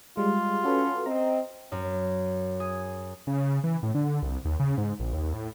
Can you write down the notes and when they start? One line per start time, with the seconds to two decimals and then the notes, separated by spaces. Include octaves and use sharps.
0.17 G3 G#3 F4
0.64 C#4 F#4 A4 B4
1.06 C4 D#5 A#5
1.72 F#2
2.60 G#4
3.27 C#3
3.64 E3
3.83 A2
3.95 D3
4.23 C2
4.45 D#2
4.60 C#3
4.78 G#2
5.00 A#1
5.13 D#2
5.34 A2